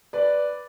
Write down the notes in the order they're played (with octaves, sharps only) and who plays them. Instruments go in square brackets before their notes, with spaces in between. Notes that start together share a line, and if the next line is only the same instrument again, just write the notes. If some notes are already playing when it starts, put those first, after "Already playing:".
[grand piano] B4 D5